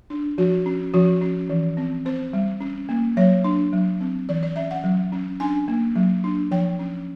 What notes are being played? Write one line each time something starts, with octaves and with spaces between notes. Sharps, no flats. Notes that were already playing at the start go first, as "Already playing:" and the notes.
D4
F3 F#4
C#4
F3 F#4
C#4
E3
C4
C4 C5
G3
C#4
A#3
F#3 C#5
D4
F#3
C4
E3 D5
D5
C#4 E5
F#5
F#3
C#4
D4 G#5
A#3
F#3
D4
F3 G5
C#4